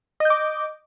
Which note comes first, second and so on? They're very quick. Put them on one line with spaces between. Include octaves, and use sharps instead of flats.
D#5 G6 D6